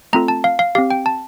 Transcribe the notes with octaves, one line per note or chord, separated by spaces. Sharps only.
A3 C4 F4 A4 A#5
A5
F5
F5
C4 G4 F5
G5
A5